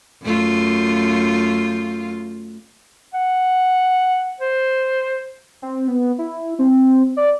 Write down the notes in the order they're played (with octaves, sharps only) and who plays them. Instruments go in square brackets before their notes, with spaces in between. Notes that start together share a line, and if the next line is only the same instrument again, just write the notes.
[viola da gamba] F#2 A3 F4
[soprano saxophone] F#5
C5
[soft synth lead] C4
B3
E4
C4
D5